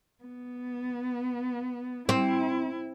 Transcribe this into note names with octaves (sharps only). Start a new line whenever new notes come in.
B3
C4 E4